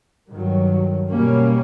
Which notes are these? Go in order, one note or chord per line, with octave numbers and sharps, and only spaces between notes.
G2 D#3 F#3
B2 G3 A#3 C#4